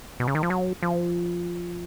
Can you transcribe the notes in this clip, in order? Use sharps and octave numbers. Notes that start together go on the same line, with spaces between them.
B2
C#3
D#3
F3
F#3
F3